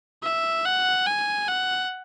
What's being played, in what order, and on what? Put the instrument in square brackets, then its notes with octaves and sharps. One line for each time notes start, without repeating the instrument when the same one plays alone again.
[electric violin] E5
F#5
G#5
F#5